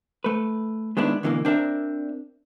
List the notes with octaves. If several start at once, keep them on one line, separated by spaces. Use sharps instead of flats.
A3 B4
D#3 G#3 B3 D4 E4
D2 B2 D3 E3 G3 A#3
C4 D4 A#4 E5